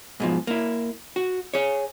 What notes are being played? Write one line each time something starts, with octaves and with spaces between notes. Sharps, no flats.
G#2 B2 F3
A#3 E4
F#4
G#4 C#5